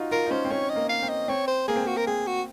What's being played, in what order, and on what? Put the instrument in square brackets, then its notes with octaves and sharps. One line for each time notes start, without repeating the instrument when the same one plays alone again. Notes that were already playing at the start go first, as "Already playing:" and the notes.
Already playing: [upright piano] D#4 F4 F#4
[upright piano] F4 [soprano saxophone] A#4
[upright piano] D#4
[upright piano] C#4 [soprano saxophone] C5
[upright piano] C4
[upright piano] C#4 [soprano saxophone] C#5
[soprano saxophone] D#5
[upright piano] A#3
[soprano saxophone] F5
[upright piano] C4
[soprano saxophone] D#5
[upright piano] C4 [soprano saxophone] C#5
[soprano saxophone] C5
[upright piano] A#3 [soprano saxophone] G#4
[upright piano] C4
[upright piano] A#3 [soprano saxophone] F#4
[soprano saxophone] A#4
[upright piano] C4 [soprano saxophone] G#4
[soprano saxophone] F#4